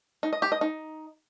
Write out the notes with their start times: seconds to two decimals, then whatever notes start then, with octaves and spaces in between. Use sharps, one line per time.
0.23 D#4
0.33 D#5
0.42 G4
0.52 D#5
0.61 D#4